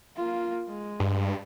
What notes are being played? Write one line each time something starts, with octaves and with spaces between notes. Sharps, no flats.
A#3 F4
G#3
G2